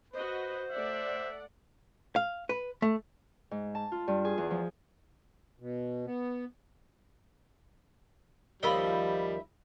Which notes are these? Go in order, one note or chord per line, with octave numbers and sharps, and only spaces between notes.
F#4 B4 C5 D#5
A3 D5 E5 F#5
F5
B4
A3
G#2
A5
F4
G2
G#4
E2
F3
B2
B3
D#2 F3 G3 A#4 D#5 E5 B5